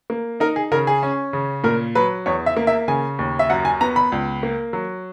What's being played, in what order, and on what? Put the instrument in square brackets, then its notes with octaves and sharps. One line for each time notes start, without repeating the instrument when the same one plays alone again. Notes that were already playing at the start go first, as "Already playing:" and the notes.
[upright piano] A#3
D#4 A#4
G#4
C#3 A#4
G#4
C#4
C#3
A#2 A#4
F#3 B4
E2 C#5
E5
A#3
E5
C#3 G#5
D#2
E5
F#2 F#5
G#5
B3 A#5
B5
C#2
A#3
F#3